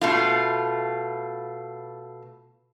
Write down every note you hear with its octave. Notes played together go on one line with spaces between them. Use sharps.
B2 A3 F4